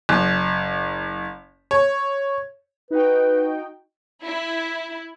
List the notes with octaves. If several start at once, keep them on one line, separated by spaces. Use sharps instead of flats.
F#1
C#5
D#4 F#4 B4 G5
E4